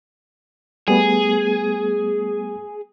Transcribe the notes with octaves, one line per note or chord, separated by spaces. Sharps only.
G3 A3 B3 G#4